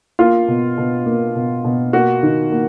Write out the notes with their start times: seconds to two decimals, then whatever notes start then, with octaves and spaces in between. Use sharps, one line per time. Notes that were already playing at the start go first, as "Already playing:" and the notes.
0.19 A#3 F4
0.48 B2
0.78 B2
1.06 A#3
1.35 B2
1.64 B2
1.93 A#3 F#4
2.23 D#3
2.52 A#3